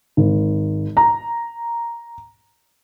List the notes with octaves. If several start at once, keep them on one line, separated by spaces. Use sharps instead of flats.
G#1
A#5